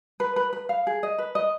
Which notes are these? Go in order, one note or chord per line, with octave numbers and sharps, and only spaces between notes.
B4
B4
B4
F5
G#4
D#5
B4
D#5